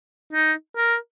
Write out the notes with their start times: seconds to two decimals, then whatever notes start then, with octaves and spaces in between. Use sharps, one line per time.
0.33 D#4
0.76 A#4